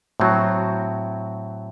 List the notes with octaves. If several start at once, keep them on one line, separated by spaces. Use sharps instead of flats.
A2 F#3 C4 F#4